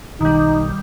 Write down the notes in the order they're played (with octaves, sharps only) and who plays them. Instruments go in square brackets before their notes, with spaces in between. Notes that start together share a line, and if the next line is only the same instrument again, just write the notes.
[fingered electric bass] B1 [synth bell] D#3 G3 [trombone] D#4